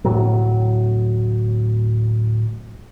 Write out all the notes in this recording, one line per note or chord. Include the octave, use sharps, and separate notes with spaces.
D1 A2 F#3